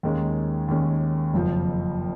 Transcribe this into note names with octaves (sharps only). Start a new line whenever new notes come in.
D#2 D#3 G#3 C#4
D#2 D#3 G#3 C#4
F#1 F2 F3